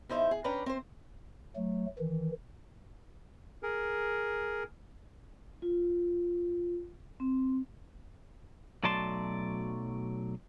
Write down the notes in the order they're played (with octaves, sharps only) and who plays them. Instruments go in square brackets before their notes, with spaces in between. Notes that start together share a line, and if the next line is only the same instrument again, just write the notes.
[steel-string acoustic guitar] E2 D#4 C5 E5
G#4
C#4 D4 B4 D5 G5 A#5
C4 C5
[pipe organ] F#3 A3
D#3 E3
[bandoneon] G#4 A#4
[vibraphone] F4
C4
[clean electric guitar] B1 F#3 A3 D5 A5 C6